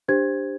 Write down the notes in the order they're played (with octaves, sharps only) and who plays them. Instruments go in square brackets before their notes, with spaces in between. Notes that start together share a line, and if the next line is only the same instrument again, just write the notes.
[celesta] D4 G4 C5 G#6